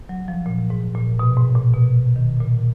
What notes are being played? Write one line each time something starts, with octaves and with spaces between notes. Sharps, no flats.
F#3
F3
A#2
G#2
A#2
B2
G#2
A#2
B2
D#3
A#2